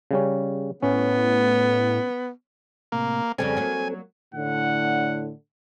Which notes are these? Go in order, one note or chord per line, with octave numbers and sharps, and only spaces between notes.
C#3 G3 C#4
A2 B3 C#4
A2 C3 A#3
F2 C#3 G3 C4 A4 G#5
F#3 A#3
A2 D3 F#5